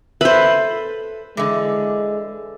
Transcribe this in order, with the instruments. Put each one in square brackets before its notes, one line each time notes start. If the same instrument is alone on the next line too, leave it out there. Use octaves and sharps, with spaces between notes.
[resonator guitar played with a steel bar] A4 E5 [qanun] B4 C5
[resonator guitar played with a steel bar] D3 E3 [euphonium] G#3